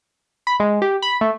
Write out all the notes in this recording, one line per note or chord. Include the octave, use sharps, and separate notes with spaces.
B5
G#3
G4
B5
A3